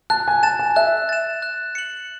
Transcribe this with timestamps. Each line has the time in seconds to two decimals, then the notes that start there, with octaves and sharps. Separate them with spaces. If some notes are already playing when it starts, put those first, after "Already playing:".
0.10 A5 F#6
0.28 G#5
0.43 A5 A6 E7
0.59 G#5
0.76 E5 F#6
1.09 A6 E7
1.42 F#6
1.75 C#7 F#7